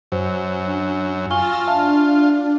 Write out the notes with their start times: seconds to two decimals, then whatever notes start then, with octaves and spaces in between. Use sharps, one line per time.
0.12 F#2 C5
0.67 D4
1.30 F4 G#5 C#6 E6 A6 A#6 G7
1.67 D4 E5 F5 A5